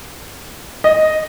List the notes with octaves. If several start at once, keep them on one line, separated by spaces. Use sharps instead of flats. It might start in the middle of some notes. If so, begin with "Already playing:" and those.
D#5